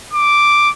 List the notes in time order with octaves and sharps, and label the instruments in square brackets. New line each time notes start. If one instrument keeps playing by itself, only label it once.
[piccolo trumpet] D6